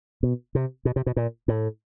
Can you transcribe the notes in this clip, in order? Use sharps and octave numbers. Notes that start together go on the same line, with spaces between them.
B2
C3
B2
C3
B2
A#2
A2